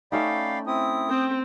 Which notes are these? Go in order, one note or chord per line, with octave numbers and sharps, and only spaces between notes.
A3 C#4 D#4 D5 F5 G5 B5
C4 E4 D#6
C4 G5